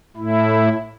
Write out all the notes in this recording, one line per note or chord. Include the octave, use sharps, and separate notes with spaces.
A2 E4